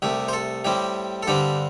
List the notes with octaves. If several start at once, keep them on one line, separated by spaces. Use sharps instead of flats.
C2 C3 A3 G4
C5
A4
A2 G3 C4 G4
A4
G2 D3 G3 C4 G4